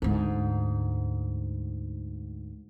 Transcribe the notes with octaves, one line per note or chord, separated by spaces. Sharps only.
D2 G#2